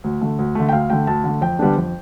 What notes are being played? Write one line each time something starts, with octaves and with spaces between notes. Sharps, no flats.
D2
D3 A3
D2
D3 A3
G5
D2 F5
D3 A3 G5
D2 A5
D3 A3
F2 G5
D3 G3 B3 D4
F2